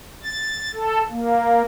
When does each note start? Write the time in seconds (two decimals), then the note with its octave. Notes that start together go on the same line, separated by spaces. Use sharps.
0.23 A6
0.74 A4
1.10 A#3